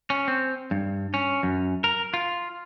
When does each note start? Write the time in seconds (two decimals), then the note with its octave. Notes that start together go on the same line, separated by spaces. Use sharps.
0.10 C#4
0.28 C4
0.71 G2
1.14 C#4
1.43 F#2
1.84 A#4
2.14 F4